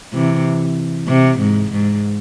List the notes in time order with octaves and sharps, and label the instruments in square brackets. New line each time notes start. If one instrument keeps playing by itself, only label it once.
[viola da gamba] C3 E3
C3
G#2
G#2